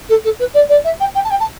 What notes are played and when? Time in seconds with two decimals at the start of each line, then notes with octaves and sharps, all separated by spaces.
0.09 A4
0.24 A4
0.39 B4
0.54 D5
0.69 D5
0.84 E5
1.00 G5
1.14 G5
1.24 A5
1.30 G5
1.40 A5